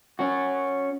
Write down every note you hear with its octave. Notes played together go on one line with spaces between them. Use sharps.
C#4 F#4